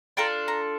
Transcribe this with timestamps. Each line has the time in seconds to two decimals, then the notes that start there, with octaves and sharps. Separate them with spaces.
0.17 D4 F4 A4 G5 A#5
0.48 A#5